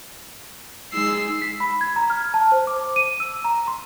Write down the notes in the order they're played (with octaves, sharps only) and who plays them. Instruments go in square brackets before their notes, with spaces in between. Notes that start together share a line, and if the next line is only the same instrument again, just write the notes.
[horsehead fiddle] G#3 D#4 [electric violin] E6 C7
[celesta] B6
B5
G#6
A#5
F6
A5
C5
D6
D#7
E6
A#5
C6